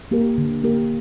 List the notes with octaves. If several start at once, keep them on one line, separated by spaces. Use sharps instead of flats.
A#3 G4 A#4
D3
A#3 G4 A#4